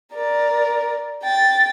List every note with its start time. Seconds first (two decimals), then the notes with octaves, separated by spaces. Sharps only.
0.15 A#4 D5
1.23 G5 A6